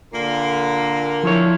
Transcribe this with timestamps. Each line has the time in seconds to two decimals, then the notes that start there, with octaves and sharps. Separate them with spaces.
0.14 A#2 D3 A#3
1.23 F3 E4 C#5